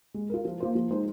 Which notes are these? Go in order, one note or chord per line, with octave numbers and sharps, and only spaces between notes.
G#3
F4 A#4
F3
A#3 F4 C5
F3
G#3 D#4 C5